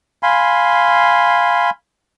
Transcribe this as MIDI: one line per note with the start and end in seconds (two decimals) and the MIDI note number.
0.23 1.70 77
0.23 1.70 80
0.23 1.70 83
0.23 1.70 84